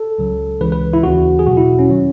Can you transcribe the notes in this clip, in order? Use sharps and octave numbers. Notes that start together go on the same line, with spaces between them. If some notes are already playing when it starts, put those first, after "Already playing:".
Already playing: A4
C#2 C#3 F#3
C#2 C#3 E3 B4
B4
E4
D#2 C#3 E3 F#4
G#4
E2 B2 F#3 F#4
E4
C#4
D#3 F#3